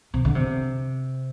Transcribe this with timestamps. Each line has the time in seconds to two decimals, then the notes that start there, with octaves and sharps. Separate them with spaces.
0.14 C3
0.25 D3
0.35 C3